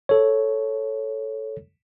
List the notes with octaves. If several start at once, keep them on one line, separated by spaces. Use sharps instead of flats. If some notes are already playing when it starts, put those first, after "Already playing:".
A4 C#5